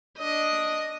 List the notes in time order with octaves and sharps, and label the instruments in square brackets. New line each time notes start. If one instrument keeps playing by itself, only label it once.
[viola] D4 D#5